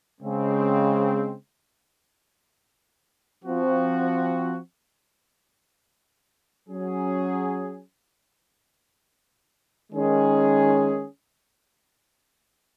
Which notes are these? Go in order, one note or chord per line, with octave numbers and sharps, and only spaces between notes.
C#3 G#3 C4
F3 C4 F#4
F#3 C#4 G#4
D#3 G#3 C#4 G#4